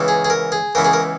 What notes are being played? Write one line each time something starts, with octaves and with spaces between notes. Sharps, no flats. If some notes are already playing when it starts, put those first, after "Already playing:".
Already playing: C#2 C#3 E3 B3
G#4
G#4
A#4
G#4
C#2 C#3 E3 B3 A#4
G#4
A#4